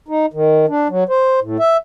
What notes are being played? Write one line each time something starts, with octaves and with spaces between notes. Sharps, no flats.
D#4
D#3
D4
F#3
C5
A2
E5